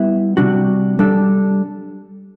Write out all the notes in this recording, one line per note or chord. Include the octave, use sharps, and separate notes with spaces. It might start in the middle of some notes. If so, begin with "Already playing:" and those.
Already playing: G3 B3 E4 B4 E5
C3 G3 D4 F#4
G3 D4 A4